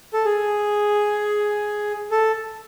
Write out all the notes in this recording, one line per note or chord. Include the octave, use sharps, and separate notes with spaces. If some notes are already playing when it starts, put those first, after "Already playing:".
A4
G#4
A4